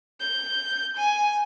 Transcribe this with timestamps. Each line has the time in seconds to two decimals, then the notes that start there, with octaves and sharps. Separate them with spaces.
0.20 G6
0.97 G#5